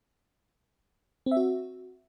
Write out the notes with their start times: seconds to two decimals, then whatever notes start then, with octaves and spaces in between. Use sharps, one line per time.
1.26 C4
1.31 E5
1.37 F#4